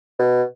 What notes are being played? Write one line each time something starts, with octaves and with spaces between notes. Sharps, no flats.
B2